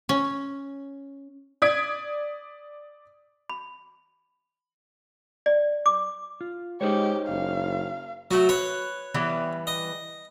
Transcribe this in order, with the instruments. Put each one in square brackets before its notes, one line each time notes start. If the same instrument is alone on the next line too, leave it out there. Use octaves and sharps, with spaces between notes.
[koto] C#4
[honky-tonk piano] D5 D#6 G#6 B6 D7
[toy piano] B5
D5
D6
[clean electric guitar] F4
[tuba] G#3 [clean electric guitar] D#4 C5 C#5 [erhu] G4
[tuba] F#1 [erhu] F5
[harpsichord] F#3 [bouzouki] A3 F#4
[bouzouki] B4 [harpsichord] C#5
[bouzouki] E3 G3 B3
[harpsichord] D#5